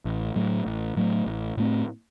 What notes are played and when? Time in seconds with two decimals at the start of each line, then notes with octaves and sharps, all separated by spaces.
0.05 A1
0.36 A2 F#3 A3
0.67 A1
0.97 A2 F#3 A3
1.26 A1
1.57 A2 A3 C4